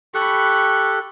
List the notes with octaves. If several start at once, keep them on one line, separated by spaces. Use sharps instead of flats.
G4 A4 B5 C#6 F#6